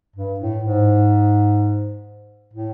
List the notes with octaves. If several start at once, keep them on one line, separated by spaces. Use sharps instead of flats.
G2
A2
G#2
A2